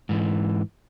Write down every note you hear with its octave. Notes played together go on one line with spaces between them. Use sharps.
G#2 E3